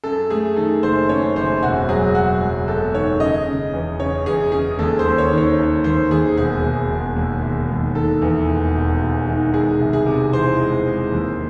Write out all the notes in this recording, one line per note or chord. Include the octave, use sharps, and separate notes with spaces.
F#2 A4
A3 G#4
D#3 A4
F#1 C5
F#2 C#5
F#1 C5
E1 F#4
F#3 G#4
F#3 F#4
F#3
E1 A4
D#3 C#5
C#3 D#5
C#3
E2
C#3 C#5
E2 G#4
C#3 G#4
D#2 A4
C5
D#2
C#5
D#3
C#5
D#2
D#2 C5
D#2 G#4
E1 G#4
E1
E1
D#2
E1
D#2
D#3 A4
E2
E1
E1
E1
D#3
G#3 G#4
C2
G#4
C3
E3 C5
G#3
G#3
D#2